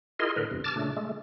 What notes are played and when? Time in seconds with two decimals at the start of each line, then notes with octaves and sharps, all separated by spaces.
0.19 E4 F4 G#4 A#4 D#5 C6
0.36 A2 D3 A#4 B4
0.51 E2 G2 C3
0.64 A5 D6 F6 A6
0.76 A#2 C#3 A3 D4
0.97 G#3 A3